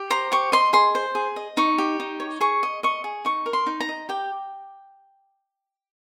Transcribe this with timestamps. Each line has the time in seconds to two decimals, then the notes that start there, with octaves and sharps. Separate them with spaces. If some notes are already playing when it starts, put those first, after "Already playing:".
Already playing: G4
0.10 C5 A#5
0.32 G4 C#6
0.52 D#5 C6
0.73 G#4 C6
0.95 C5
1.15 G#4
1.36 D#5
1.57 D#4 C#6
1.78 G4
2.00 D#4
2.20 C#5
2.41 G#4 C#6
2.63 D#5
2.83 D#5 C#6
3.04 G#4
3.25 D#4 C#6
3.46 A#4
3.53 C6
3.66 D#4
3.80 A#5
3.89 D#5
4.09 G4 G5